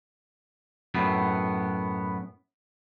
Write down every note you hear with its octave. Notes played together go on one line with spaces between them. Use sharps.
F#2 A2 B3